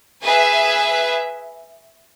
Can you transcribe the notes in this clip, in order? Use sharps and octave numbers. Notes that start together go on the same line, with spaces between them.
G#4 B4 E5 G#5